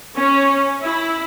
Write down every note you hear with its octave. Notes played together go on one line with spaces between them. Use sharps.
C#4
E4